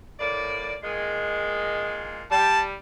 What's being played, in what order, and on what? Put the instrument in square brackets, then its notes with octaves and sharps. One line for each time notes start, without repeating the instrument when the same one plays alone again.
[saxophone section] A2 A#3 D5
A#2 D#3 G#3
[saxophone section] G3 [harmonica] A5